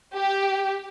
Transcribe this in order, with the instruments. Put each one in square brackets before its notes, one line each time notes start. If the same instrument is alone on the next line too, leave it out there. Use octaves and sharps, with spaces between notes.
[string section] G4